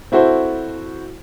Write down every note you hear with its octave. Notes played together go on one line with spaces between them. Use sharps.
C4 E4 F#4 A4 C5